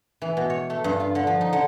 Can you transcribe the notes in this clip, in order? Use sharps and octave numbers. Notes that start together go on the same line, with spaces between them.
E3
B2
C#5
A3
G2
F4
D3
F3
D#4
D3